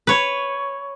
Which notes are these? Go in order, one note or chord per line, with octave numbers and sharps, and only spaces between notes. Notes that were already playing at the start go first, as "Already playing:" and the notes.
B4 C#5